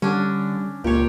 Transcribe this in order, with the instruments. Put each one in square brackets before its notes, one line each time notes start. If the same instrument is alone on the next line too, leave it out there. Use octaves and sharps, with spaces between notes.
[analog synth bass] D3 [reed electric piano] G3 [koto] C#4 D4
[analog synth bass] C#2 [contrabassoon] A#2 [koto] G4 C#5